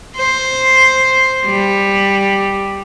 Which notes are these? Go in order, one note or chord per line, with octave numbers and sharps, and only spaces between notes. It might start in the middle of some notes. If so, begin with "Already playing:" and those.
C5
G3